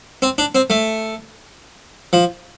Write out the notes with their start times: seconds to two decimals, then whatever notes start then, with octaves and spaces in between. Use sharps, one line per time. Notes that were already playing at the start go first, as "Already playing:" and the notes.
0.22 C4
0.38 D4
0.55 C4
0.70 A3
2.13 F3